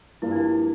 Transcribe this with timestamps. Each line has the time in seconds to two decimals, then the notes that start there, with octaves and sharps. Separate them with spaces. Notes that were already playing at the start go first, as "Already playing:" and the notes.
0.22 G2 F3 A#3 E4
0.32 D4
0.36 E4